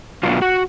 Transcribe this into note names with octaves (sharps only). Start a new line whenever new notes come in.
B2 F#3 B3 D4 F4
F#4